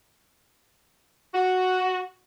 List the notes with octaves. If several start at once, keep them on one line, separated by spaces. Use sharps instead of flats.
F#4